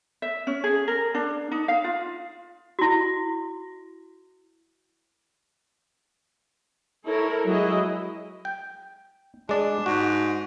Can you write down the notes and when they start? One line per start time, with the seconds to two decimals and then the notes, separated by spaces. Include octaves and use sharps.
0.22 E5
0.47 C#4
0.64 G#4
0.88 A#4
1.14 D4
1.51 D#4
1.68 F5
1.84 F4
2.79 E4 F#4
7.06 E4 A4 A#4 C#5
7.47 F#3 G#3 E4 G#4 D#5
8.45 G5
9.49 G#3 D4 D5
9.86 G#2 F#4